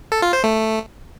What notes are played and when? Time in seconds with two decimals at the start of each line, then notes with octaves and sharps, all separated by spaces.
0.12 A4
0.22 F4
0.33 C5
0.44 A3